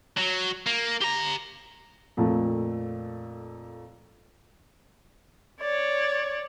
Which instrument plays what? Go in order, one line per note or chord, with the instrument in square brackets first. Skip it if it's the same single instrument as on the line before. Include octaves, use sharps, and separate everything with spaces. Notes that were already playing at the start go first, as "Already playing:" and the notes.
[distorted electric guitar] F#3
A#3
G4 A#5
[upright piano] F2 A#2 A3
[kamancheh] C#5 D5